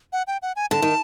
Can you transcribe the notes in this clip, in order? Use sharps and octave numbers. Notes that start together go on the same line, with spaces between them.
F#5
G5
F#5
G#5
D3 A5
D#3